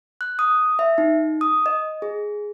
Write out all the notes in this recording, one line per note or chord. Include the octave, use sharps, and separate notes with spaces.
F#6
D#6
E5
D#4
D#6
D#5
G#4